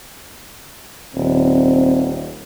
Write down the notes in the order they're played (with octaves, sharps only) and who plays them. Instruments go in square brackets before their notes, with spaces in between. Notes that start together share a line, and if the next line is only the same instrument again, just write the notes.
[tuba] D#1 [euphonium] C4